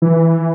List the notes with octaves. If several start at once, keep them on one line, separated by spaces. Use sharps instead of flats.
E3